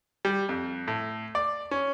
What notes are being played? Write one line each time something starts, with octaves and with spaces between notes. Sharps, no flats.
G3
F2
A2
D5
C#4